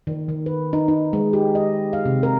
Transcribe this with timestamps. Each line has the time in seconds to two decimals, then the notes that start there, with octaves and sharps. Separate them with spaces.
0.07 D#3
0.29 D#3
0.46 B4
0.73 D#4
0.88 D#4
1.13 G#3
1.33 G4
1.55 D#5
1.93 F5
2.05 C3
2.23 A#4